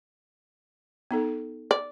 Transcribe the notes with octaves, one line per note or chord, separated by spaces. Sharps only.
B3 D#4 A4
D5